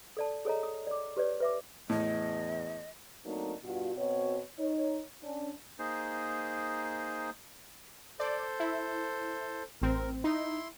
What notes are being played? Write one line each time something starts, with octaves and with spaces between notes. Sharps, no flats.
A4 D5 A5
G#4 A4 C#5 D#5 A#5
D#6
D5 D6
G4 B4 C#5 D5
B4 E5 D6
E2 A2 D#5
F#3 A3 A#3 C4 D4 D#4
G2 B2 F4 F#4
B2 C4 F#4 C#5
D#4 C#5
C#4 D4
A#3 D#4 G#4 C5
A4 C5 D5
E4
A1 C4 A#4
D#4 E4 C6